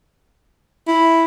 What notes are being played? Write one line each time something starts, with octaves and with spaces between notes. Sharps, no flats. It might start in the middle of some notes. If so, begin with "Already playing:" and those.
E4